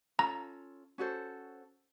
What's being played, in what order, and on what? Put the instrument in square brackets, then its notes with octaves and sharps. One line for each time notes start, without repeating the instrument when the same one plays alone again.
[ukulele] C#4 F4 A4 [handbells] A#5
[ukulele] C#4 F#4 A4 C5